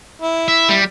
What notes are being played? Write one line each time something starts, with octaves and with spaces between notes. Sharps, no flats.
E4
E5
G3